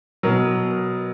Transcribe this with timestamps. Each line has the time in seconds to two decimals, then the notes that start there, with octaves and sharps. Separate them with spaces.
0.23 B2 F#3 A#4